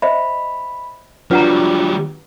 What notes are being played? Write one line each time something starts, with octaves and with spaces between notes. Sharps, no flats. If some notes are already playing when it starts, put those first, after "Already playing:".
C5 D#5 E5 B5
F#3 G3 D4 F4 B4 F#5 A#5